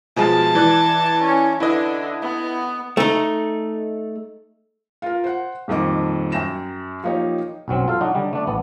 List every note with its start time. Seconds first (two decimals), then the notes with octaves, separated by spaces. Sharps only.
0.16 B2 F3 G#3 A5
0.55 E3 D5 F#6
1.22 C#4
1.60 D3 E4 B4 D#5
2.22 B3
2.97 A3 D#4
5.02 F4 A#4
5.24 C5 F#5
5.68 D#1 F2 D#3 D#5 D6
6.32 F#2 G5 A#6 E7
7.04 F3 A#3 D#4 G4 C#5
7.68 B1 F#2 F#3 C4
7.88 F4 A4 F5
8.01 F#3 D4 D#4 F#4
8.15 D3 G3
8.33 A3 D4 D5
8.47 A1 B3